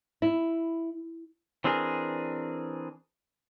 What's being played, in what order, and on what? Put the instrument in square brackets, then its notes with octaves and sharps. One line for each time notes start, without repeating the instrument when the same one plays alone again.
[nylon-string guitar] E4
[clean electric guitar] E3 C4 D4 G#4 A#4